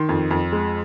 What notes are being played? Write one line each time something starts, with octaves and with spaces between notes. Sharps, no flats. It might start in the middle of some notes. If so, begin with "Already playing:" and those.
Already playing: D#3 C6
F2
F2
G#3